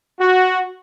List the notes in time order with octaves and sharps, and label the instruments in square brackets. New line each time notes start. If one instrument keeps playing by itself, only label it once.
[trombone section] F#4